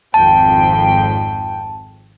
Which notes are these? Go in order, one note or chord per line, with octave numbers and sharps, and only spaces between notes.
G#1 F2 G5 A5